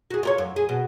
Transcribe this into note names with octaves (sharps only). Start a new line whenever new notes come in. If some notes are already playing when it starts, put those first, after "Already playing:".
F#4 G#4
F4 A#4 C#5
F#2
G#4
B2